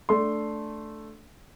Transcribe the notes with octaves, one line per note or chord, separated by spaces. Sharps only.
A3 D4 C6